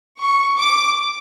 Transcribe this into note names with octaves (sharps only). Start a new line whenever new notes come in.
C#6
D6